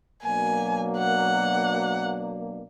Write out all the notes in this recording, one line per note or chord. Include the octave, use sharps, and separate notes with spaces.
B2 F#3 A#3 D4 G#5
F#5